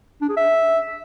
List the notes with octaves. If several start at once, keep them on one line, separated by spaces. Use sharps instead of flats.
D4
G#4
E5